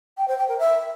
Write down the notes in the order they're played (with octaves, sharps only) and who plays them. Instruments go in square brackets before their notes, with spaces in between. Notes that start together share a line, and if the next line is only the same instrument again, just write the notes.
[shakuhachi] G5
C5
G5
A#4
E5